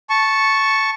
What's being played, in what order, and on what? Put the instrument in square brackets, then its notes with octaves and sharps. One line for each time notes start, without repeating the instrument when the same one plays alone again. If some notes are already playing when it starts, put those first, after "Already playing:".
[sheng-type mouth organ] A5 C#6